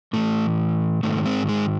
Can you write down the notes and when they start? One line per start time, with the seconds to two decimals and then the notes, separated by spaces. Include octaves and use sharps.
0.13 A2 E3 A3
1.03 G#2 D#3 A3
1.26 G#3 C4
1.49 G#3